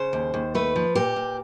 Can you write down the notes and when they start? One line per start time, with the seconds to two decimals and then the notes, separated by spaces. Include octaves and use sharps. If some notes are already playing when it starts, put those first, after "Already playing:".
Already playing: C#3 C5
0.13 D#2
0.34 D#2
0.55 A3 B4
0.76 F3
0.95 A#2 G4
1.16 A#2